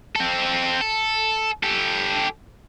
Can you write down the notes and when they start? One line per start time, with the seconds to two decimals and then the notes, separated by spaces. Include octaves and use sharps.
0.16 C4 A4
0.81 A4
1.63 G4 A4